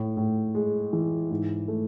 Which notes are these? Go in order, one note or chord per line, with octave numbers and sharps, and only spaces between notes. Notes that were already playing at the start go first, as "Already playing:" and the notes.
Already playing: A2
A2
G#3
E3
G#2
A3